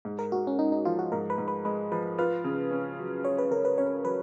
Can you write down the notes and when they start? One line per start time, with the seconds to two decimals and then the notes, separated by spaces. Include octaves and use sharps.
0.05 G#2
0.19 A#4
0.32 G#2 F#4
0.47 C#4
0.59 G#3 D#4
0.72 D#4
0.85 F3 F4
0.99 F#4
1.12 G#2 A#4
1.30 B4
1.38 G#2
1.48 B4
1.65 G#3 B4
1.92 F3 B4
2.18 F4 B4
2.44 C#3
2.71 C#4
2.99 F#3
3.25 F4 C#5
3.38 B4
3.51 C#3 A#4
3.65 B4
3.78 C#4 C#5
4.04 F#3 B4